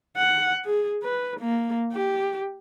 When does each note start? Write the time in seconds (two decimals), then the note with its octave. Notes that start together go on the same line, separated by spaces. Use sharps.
0.17 F#5
0.65 G#4
1.03 B4
1.39 A#3
1.93 G4